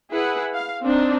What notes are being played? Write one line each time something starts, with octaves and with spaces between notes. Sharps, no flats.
E4 G#4 B4 F#5
F5
C4 D4 D#4